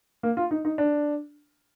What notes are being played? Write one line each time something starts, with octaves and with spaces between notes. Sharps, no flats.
A#3
F4
D#4
D#4
D4